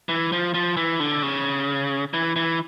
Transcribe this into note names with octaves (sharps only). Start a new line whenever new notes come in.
E3
F3
F3
E3
D3
C#3
E3
E3